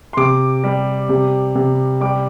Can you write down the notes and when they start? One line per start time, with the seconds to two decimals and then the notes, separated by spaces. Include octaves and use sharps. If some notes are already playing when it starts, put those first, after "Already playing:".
0.13 C6
0.17 C3 D6
0.64 G3
1.09 C3
1.55 C3
2.01 G3 D6